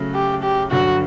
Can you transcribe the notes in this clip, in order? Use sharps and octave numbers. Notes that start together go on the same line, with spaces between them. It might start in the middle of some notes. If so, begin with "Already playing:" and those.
Already playing: C#3 F#3 A3
G4
G4
G2 D3 F#3 F#4